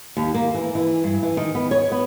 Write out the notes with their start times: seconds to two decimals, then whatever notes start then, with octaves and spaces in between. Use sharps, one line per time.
0.17 D#2
0.34 A#3
0.54 E3
0.75 E3
1.04 G2
1.23 E3
1.37 D#3
1.55 B3
1.71 C#5
1.92 B3